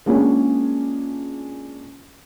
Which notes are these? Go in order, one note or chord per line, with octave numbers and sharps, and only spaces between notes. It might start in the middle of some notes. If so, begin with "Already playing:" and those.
G#3 A#3 C#4 D4 F4 G#4